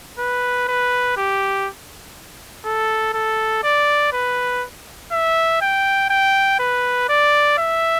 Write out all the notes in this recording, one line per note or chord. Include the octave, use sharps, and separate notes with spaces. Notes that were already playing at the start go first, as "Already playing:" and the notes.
B4
B4
G4
A4
A4
D5
B4
E5
G5
G5
B4
D5
E5